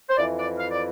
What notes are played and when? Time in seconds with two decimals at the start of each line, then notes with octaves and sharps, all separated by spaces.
0.10 C5
0.17 F2 E3 D5
0.38 D5
0.58 F5
0.71 D5